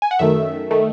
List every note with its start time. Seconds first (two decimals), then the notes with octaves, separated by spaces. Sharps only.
0.02 G#5
0.11 F#5
0.19 F#2 D#3 A3 E5
0.71 D#3 A3